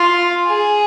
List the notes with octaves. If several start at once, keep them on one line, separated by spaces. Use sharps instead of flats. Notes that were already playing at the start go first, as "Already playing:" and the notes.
Already playing: F4
G#4